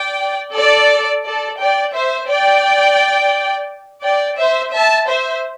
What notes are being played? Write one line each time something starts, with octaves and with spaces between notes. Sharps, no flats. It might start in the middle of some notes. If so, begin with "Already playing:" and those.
Already playing: D5 G5
A4 D5
A4 D5
D5 G5
C5 E5
D5 G5
D5 G5
C5 E5
E5 A5
C5 E5